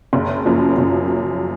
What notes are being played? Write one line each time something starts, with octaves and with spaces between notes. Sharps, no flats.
F#1
F#2 F3 A#3
F#1